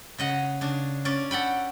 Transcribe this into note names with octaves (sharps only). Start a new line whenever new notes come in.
C#3 D#5 F#5
C#3 D4
C#4 D5
A4 F#5 G5 B5